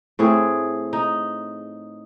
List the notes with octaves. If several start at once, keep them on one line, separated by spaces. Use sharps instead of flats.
A2 C4 G#4
D#4